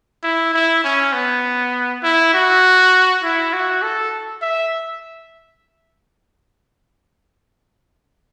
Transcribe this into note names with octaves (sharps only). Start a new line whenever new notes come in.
E4
E4
C#4
B3
E4
F#4
E4
F#4
A4
E5